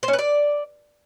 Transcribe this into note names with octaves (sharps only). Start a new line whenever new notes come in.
C5
C#4
B4
D5